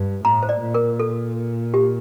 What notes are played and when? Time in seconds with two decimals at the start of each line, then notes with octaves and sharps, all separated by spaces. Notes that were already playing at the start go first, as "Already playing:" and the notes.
Already playing: G2
0.24 A2 A#5
0.43 C5
0.49 D5
0.62 A#2
0.74 A#4
1.00 A4
1.74 G4